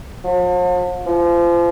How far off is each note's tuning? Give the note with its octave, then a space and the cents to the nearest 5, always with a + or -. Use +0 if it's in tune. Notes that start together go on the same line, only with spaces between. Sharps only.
F3 +45
F3 -30